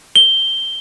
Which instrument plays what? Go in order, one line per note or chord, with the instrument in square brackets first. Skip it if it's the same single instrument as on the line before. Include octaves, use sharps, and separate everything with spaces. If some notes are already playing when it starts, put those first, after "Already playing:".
[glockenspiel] G7